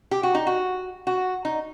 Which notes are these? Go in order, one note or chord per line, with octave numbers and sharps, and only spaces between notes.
G4
F#4
D#4
F#4
F#4
D#4